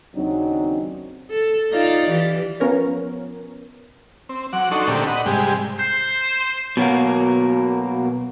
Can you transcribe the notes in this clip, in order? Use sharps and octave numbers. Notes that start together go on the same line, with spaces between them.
D#2 C#3 F#3 C4 D4 D#4
A4
D#4 F4 D5
E3 G4
F3 B3 C#4 A#4 C#5
C4
F#3 F#5 D6
D4 D#4 F#4 A4 C6 C#6
A#2 D3 A3 C4 D4 G4
D#5 F#5 B5
G#2 C3 G3 G#3 G4
C5 G6 C7
B2 F#3 A#3